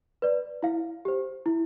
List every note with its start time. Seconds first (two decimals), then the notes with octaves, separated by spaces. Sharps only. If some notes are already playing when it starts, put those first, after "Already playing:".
0.22 B4 D5
0.63 E4 F5
1.05 G4 C5
1.46 E4